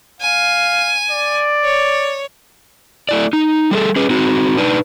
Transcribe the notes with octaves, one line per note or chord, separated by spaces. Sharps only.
F5 G#5
D5
C#5
A3 E4 D5
D#4
G3 G#4 A4
C#4 G#4 B4
C4 D#4 F#4
D4 D#4 B4